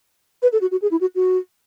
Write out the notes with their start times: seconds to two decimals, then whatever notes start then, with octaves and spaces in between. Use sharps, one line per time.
0.42 B4
0.53 A4
0.61 F#4
0.71 F#4
0.82 G#4
0.91 E4
1.01 F#4
1.15 F#4